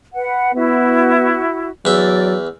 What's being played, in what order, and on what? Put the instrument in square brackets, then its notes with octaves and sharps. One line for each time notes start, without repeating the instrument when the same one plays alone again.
[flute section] B4 F#5
[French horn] B3 [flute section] E4 F#4
[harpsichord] E2 E5 [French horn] F#3 [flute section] D5